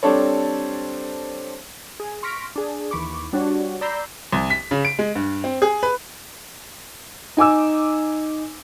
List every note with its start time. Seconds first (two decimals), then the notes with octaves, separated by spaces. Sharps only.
0.03 G3 C4 D4 A4 C#5
2.00 G#4
2.23 C6 C#6 F6 A#6 B6 D7
2.56 D4 G#4
2.91 D#2 E3 B5 C#6 D6
3.33 G3 D4 F#4 C#5
3.81 D5 A#5 B5 E6 G6 C7
4.33 C2
4.50 B6
4.71 C#3
4.85 D7
4.99 G#3
5.15 G2
5.44 C4
5.62 G#4
5.83 B4
7.37 D#4 G#5 D6 E6